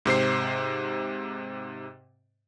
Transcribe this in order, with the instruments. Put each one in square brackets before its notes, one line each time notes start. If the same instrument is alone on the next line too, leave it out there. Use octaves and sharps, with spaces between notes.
[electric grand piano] G#2 C3 C5 C7